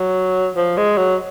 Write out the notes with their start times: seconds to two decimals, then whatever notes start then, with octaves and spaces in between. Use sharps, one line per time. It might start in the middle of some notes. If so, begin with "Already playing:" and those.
Already playing: F#3
0.56 F3
0.77 G#3
0.97 F#3